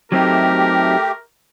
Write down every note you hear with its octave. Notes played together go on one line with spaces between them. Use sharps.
F#3 A3 C4 D#4 G4 A#4